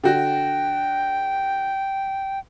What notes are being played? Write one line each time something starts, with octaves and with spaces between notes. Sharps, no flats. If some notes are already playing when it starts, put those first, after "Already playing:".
D3 F#4 G5